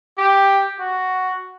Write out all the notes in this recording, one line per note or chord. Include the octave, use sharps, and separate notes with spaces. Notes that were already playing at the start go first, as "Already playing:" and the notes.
G4
F#4